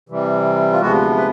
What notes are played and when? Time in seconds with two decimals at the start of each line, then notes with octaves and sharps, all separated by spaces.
0.09 C3 E3 G3
0.73 F4
0.80 D2 C3 F3 G#3 B3 F#4
1.16 B4